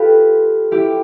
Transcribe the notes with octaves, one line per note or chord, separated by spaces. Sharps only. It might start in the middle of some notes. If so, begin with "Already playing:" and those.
Already playing: F4 G4 A4 B4
E4 G4